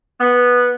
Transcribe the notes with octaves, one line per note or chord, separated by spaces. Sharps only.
B3